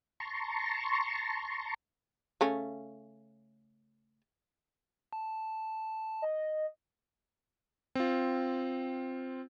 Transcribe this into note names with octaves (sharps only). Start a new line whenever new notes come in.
A5 A#5 C6 C#6
C#3 A3 C#4
A5
D#5
C4 F4